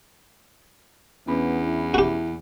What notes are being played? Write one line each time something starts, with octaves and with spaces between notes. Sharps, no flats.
E2 B3 C#4 D4 B5
E4
F#4 G4